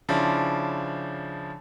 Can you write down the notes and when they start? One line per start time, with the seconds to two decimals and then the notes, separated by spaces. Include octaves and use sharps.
0.09 C#3 F3 D4 E4